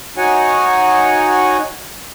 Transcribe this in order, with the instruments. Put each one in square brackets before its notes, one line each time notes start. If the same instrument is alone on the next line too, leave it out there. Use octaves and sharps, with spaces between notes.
[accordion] D#4 F#4 C#5 F#5 G#5